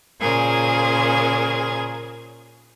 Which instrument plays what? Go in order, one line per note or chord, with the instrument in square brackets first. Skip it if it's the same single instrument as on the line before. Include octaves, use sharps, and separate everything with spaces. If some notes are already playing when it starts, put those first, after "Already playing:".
[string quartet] A#2 C#3 G#4 A#4 C5 G#6